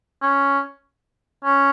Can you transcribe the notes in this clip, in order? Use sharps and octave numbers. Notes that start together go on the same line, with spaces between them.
C#4
C#4